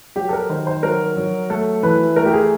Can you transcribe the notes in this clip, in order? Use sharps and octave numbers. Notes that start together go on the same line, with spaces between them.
F#3 G4
A4
A#4
D#3 C5
C5
F#3 A#4
F#3
A3 A4
E3 B4
A3 A#4
G4
G#4